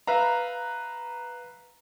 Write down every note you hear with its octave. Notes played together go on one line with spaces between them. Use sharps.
B4 E5 F5 A#5